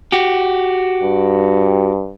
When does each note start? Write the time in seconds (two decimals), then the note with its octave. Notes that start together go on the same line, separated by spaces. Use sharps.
0.12 F#4 G4
1.03 G2